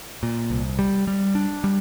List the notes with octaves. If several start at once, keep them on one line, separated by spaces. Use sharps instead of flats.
A#2
C2
G3
G3
D4
G3